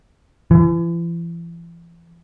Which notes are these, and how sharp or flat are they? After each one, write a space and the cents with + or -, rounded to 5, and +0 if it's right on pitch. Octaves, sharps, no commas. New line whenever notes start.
E3 +40